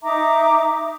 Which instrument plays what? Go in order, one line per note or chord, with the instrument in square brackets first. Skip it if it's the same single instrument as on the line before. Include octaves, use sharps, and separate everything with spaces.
[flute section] D#4 E5 A#5 D6